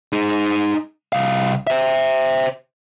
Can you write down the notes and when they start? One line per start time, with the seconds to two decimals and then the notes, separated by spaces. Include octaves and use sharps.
0.12 D#4 G#4
1.13 C2 F5
1.67 C5 E5